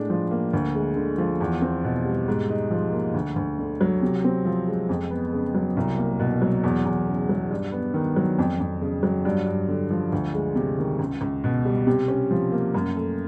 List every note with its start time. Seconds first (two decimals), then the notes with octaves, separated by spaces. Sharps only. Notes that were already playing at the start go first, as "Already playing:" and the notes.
Already playing: A2 G#3 D4
0.10 F3
0.31 A#3
0.53 D2
0.75 G#3
0.97 D3
1.18 F3
1.41 E2
1.62 C4
1.84 B2
2.05 G3
2.28 G#2
2.49 D#4
2.71 F3
2.93 A#3
3.14 D2
3.36 D2
3.59 D3
3.81 F#3
4.02 C3
4.24 C4
4.45 F3
4.68 G#3
4.89 F2
5.10 B3
5.33 C#3
5.54 F#3
5.77 C2
5.98 A#3
6.20 B2
6.42 F#3
6.64 E2
6.85 E2
7.07 C#3
7.29 F#3
7.51 G2
7.72 B3
7.94 D#3
8.16 F#3
8.39 F2
8.59 F2
8.82 C#3
9.03 F#3
9.25 G2
9.46 G2
9.68 D3
9.91 F3
10.12 D2
10.34 G#3
10.55 C3
10.78 D#3
10.99 C#2
11.21 C#2
11.44 B2
11.65 G3
11.87 C3
12.08 C#4
12.31 F3
12.52 A#3
12.74 F#2
12.96 A3